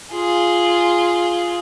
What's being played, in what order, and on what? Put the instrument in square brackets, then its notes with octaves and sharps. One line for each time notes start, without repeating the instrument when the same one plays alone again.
[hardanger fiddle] F4 G#4